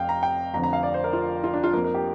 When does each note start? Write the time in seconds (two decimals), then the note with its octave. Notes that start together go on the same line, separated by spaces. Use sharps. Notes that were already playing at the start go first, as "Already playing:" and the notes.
Already playing: F1 F2 C3 F5 G5
0.09 A#5
0.23 G5
0.53 F1 F2 D3 F3 A#5
0.63 A#5
0.73 F5
0.83 D5
0.94 C5
1.04 A#4
1.13 F4
1.44 F4
1.53 D4
1.63 F4
1.74 F2 F3 A#3 A#4
1.84 A#4
1.94 G4